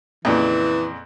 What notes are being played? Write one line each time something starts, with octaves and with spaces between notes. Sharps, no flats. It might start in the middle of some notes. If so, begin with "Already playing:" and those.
F2 A#2 C#3 E3